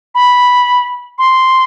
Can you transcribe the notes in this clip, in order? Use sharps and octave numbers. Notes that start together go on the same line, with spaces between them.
B5
C6